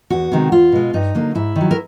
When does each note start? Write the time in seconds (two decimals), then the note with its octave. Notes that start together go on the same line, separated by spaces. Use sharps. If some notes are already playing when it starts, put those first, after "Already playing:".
0.10 E2 F#4
0.32 C3 D#3 G#3
0.52 E2 F4
0.72 B2 G#3
0.93 G2 D#4
1.15 D3 F#3 A#3
1.35 G#2 E4
1.56 D#3
1.61 F#3
1.71 A#4